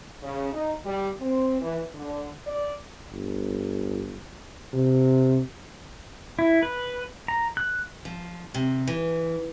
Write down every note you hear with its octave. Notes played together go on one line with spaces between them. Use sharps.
C#3
D#4
G3
C4
E3
D3
D5
G1
C3
E4
B4
A#5
F#6
F3
C3
E3